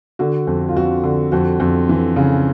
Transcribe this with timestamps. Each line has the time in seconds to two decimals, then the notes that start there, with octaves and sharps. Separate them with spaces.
0.19 D3 F#4
0.47 F2
0.69 F4
0.76 F2 F#4
1.04 D3
1.32 F2 F#4
1.60 F2
1.89 E3
2.16 C#3